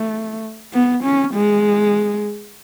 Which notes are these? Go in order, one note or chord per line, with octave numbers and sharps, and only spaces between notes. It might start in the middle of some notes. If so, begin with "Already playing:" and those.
Already playing: A3
B3
C#4
G#3